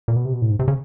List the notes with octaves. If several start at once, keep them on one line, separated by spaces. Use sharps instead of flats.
A#2
B2
C3
B2
A2
G#2
C3
C#3